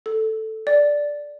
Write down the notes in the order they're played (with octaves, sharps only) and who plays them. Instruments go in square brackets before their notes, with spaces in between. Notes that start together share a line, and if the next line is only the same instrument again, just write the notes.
[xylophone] A4
D5